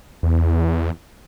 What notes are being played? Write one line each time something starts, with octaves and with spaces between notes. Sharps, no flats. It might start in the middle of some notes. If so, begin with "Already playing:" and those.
E2